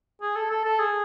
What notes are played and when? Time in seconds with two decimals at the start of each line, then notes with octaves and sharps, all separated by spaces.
0.22 G#4
0.36 A4
0.51 A4
0.65 A4
0.79 G#4